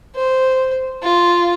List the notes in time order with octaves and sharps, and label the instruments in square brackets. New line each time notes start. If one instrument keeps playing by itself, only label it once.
[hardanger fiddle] C5
F4